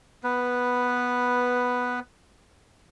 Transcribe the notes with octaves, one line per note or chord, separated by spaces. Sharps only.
B3 B4